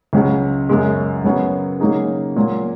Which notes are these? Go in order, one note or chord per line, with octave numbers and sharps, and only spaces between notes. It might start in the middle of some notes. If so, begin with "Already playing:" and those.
C#2 C#3 F#3
F#2 C#3 G#3
C#3 F#3 B3 F#4
C#3 F#3 A#3 D#4 G#4
A#2 F#3 A#3